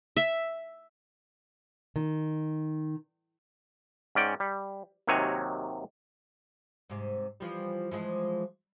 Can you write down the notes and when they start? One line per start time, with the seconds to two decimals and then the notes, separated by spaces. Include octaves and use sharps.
0.16 E5
1.96 D#3
4.15 G#2 C#4 D5 G5
4.40 G3
5.07 D#2 C3 D#3 F#3 C#5 G#5
6.90 G#2 C3
7.40 E3 F3 G3
7.91 E3 F3 G#3